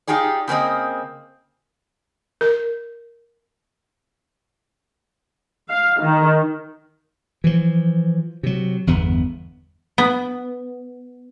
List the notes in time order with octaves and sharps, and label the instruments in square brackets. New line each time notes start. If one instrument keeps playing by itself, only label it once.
[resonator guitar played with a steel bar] D#4 F4 G4 G#4 D5
C#3 A#3 C4 D#5
[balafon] A#4
[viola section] F5
D#3
[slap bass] E3 F3
C3 F#3
G1 E2 B3
[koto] B3